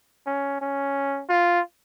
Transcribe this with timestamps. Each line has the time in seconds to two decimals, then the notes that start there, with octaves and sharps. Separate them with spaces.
0.26 C#4
0.61 C#4
1.29 F4